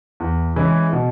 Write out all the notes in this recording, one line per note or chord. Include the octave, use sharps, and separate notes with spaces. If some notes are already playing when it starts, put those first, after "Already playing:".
E2
E3 G#3 C#4 E4
B2